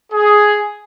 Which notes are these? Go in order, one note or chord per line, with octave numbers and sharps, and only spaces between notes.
G#4